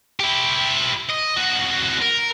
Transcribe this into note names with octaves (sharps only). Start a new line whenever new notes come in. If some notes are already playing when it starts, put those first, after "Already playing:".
E4 G4
D#5
C2 F#4
A#4